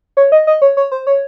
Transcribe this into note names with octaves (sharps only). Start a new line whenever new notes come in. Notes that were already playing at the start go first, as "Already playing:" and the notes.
C#5
D#5
D#5
C#5
C#5
C5
C#5